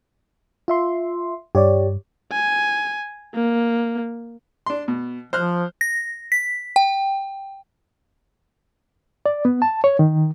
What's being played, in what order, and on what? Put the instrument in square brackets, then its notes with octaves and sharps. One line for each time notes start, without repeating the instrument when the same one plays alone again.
[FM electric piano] F4 E5 C6
[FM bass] G2 [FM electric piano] G4 C#5 D5
[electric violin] G#5
A#3
[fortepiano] D4 C6
B2
[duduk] F3 [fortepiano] C5 F6 F#6
[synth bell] A#6
B6
G5
[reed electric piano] D5
B3
A5
C#5
D#3